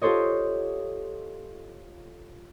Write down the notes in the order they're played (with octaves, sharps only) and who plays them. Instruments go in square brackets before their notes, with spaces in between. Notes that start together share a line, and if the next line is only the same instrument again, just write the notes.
[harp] F4 G4 A4 C5 C#5 D#5